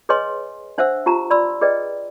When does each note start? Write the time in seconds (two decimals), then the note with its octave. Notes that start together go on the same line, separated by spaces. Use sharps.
0.09 G#4 B4 C#5 D#5 G#5 C6
0.78 D4 C5 E5 F#5 E6
1.06 F4 G4 A5 A#5
1.30 D5 B5 C6 E6
1.61 G#4 B4 D5 D#5 G5